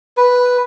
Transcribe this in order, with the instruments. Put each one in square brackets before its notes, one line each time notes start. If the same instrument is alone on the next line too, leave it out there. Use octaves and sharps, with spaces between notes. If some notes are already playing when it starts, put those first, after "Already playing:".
[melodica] B4